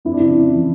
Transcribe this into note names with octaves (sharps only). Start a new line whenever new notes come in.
F2 E4
D4
C#3 E4
F2
E3